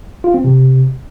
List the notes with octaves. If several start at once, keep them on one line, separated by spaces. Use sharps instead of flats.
F4
C4
C3